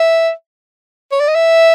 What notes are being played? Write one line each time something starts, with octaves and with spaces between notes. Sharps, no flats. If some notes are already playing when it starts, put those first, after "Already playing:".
Already playing: E5
C#5
D5
D#5
E5